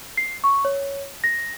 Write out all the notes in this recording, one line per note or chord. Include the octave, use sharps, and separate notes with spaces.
C7
C#6
C#5
A#6